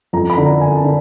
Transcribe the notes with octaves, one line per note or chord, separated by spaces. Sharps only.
F2 A#5
B5
D3
A#5
D3 G#5
A5
D3